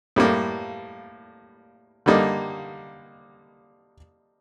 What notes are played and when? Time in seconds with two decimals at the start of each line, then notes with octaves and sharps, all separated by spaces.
0.16 A2 G3 A#3
2.06 D3 G3 A#3 D#4